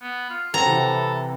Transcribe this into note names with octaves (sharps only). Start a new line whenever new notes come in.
B3
F4
C4 A4 B4 F#5 A#5
C3 E3